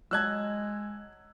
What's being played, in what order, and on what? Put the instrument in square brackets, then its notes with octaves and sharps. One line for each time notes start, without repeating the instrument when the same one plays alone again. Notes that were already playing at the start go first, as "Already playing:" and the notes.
[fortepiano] F#3 D#5 A5 [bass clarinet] G#3 [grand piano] E6 F#6 G#6